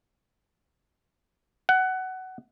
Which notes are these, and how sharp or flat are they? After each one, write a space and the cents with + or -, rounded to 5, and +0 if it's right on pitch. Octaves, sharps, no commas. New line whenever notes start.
F#5 +20